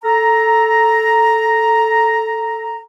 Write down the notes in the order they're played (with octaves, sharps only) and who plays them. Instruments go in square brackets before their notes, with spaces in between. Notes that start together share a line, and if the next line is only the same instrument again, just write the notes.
[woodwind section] A4 A#5